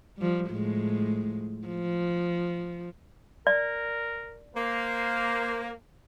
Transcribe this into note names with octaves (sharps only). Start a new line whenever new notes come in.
F3 G3
A2 F3 G#3
F3
A#4 D5
A#3 C5